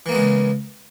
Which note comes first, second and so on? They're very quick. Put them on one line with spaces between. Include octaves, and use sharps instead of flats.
E3 A#3 B3 G#3 C#3